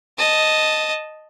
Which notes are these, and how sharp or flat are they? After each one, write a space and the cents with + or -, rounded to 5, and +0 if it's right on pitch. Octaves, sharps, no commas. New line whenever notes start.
D#5 +0 A5 +0